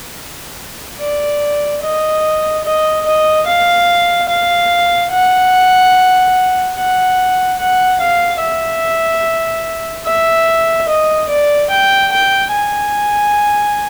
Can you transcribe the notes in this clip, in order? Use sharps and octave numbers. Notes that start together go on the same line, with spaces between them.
D5
D#5
D#5
D#5
F5
F5
F#5
F#5
F#5
F5
E5
E5
D#5
D5
G5
G5
G#5